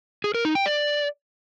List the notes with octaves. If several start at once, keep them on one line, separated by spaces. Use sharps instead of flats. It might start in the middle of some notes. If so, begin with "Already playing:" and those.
G#4
A#4
D#4
G5
D5